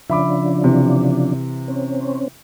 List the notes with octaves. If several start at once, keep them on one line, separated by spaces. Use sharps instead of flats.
C#3 F3 D4 E5 B5 D6
C3 E3
C4 C#4